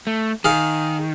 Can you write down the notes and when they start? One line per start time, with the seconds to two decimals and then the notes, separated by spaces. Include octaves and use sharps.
0.07 A3
0.44 D#3 G#4 F5